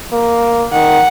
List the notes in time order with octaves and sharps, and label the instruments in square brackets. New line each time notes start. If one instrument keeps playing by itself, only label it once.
[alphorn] A#3
[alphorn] D#3 [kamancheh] F#5